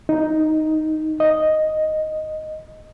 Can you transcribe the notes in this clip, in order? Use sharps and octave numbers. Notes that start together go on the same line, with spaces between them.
D#4
D#5